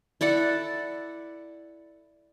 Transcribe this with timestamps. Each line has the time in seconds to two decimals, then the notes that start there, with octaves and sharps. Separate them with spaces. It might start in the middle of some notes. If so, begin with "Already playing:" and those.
0.21 E4 A4 D5 F#5